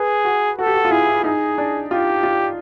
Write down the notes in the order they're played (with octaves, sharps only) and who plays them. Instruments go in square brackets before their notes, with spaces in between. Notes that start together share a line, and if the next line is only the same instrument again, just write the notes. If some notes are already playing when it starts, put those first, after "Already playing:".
Already playing: [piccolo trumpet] G#4 [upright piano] B4
[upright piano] F#4
[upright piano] F#4 [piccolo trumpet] A4
[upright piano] G4
F#4
F4
[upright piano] E4 [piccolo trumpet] G#4
[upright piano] D#4 [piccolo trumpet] G#4
[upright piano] D4
[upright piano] F4 [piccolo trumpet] G4
[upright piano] F4